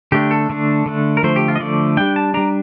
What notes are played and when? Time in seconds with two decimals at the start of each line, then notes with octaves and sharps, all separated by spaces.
0.12 D3 A3 D4 G4
0.31 A4
0.49 D3 A3 D4
0.86 D3 A3 D4
1.17 A#4
1.23 D3 F3 A3 C5
1.36 G4
1.48 F4
1.56 D#5
1.60 D3 F3 A3 D5
1.97 G3 D4 G5
2.16 A5
2.34 G3 D4 A#5